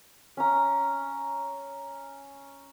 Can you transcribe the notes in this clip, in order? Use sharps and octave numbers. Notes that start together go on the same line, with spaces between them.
C#4 A#5